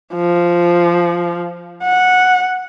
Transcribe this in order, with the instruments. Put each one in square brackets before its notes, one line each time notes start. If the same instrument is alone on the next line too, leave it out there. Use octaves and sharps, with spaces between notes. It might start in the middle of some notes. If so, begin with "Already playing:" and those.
[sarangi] F3
F#5